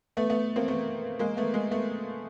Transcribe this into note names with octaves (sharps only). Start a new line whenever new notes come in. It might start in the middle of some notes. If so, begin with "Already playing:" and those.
A3 B3
A3 B3
A#3 C4
A3 B3
G#3 A#3
A3 B3
G#3 A#3
A3 B3